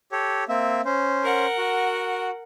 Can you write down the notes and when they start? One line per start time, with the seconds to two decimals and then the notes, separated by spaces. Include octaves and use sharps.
0.12 G4 A4 C#5
0.48 A#3 C4 E5
0.85 C#4 C5
1.24 A#4 F#5
1.58 F#4